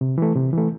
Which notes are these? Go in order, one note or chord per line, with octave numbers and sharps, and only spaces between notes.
C3
E3 A3
C3
E3 A3